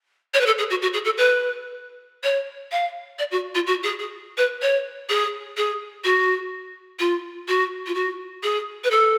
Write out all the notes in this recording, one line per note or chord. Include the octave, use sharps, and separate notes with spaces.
C#5
B4
A4
G#4
F#4
F#4
G#4
A4
B4
C#5
F5
D5
F#4
F4
F#4
G#4
G#4
B4
C#5
G#4
G#4
F#4
F4
F#4
F4
F#4
G#4
B4
A4